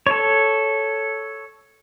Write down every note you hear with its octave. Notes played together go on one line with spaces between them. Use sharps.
A4 C#5